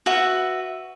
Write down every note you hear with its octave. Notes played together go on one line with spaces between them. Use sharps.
F#4 B4 E5